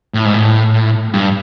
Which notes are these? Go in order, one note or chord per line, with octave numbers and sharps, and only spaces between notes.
A2
G#2
A2
G2